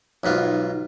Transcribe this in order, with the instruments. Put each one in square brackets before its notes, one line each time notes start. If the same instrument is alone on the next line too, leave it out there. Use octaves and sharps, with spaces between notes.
[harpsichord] B1 G#2 B3 F4